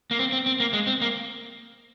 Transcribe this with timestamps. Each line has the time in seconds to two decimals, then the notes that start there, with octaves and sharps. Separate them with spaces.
0.11 A#3
0.19 C4
0.32 C4
0.46 C4
0.60 A#3
0.73 G#3
0.87 C4
1.01 A#3